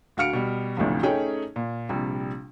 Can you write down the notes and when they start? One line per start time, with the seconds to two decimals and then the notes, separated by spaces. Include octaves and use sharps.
0.17 D2 F#4 F5 F6 C#7 D7
0.33 B2 G3
0.77 A1 D2 A2 C3 F3
1.03 A3 C#4 D#4 G#4 C#5 G5
1.56 A#2
1.89 A#1 C3 G3